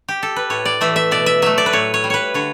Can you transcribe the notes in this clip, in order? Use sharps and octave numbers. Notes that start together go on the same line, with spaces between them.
G4
A4
B4
A2 C#5
D5
E3 A3 E5
E5
B2 D5
E5
F#3 A3 E5
D5
B4
A2 C#5
C#5
G3
B4 C#5
D3 C#5